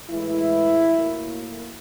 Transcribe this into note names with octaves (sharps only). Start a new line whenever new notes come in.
A2 E3 G#3 E4
A2 F#3 A#3